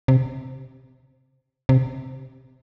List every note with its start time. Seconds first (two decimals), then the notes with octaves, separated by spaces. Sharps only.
0.08 C3
1.69 C3